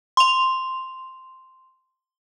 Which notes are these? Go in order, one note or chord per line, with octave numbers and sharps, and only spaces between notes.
C6 F7